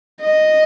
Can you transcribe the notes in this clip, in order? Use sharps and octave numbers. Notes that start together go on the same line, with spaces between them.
D#5